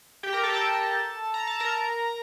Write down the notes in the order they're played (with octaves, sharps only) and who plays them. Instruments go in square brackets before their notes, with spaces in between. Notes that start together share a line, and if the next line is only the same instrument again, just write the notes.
[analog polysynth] G4 G5
A#4 A#5
A4 A5
G5
A4 A5
A#5
A5
A#4 A#5